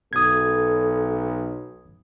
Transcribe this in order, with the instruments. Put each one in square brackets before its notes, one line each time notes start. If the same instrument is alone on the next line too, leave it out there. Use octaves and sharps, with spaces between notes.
[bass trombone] B1 [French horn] A4 [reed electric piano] D#6 G#6